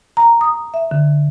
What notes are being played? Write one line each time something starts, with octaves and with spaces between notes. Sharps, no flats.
A#5
D#6
E5
D3